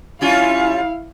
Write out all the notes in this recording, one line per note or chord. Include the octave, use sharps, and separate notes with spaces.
G3 C#4 E4 F4 F5